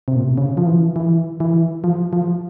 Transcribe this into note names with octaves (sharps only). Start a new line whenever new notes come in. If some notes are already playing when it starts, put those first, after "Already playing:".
C3
A#2
C3
C#3
F3
E3
E3
E3
F3
F3